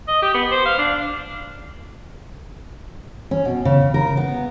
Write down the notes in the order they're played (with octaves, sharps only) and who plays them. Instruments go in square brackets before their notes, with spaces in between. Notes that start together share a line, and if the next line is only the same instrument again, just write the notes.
[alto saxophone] D#5
G4
B3
C5
F5
D4
[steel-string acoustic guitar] C#4
B2
C#3
A#4
B3